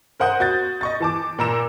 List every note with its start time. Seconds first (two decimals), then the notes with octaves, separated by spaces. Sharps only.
0.20 A#4 C5 F#5 D#6 G6
0.40 F#4 G6 A6
0.81 D#5 C#6 A6
1.00 E3 A5 D6
1.39 A#2 A#4 A#5 E6 E7